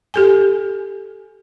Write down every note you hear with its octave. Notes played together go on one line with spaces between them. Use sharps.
G4 A4 G#5